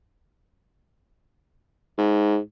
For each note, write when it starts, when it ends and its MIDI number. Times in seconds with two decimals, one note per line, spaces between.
1.98 2.38 44